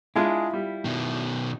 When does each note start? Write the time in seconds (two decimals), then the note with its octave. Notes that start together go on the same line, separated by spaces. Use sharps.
0.16 G#3 D4 E4 F4 G#4
0.53 G3
0.85 B2 D#3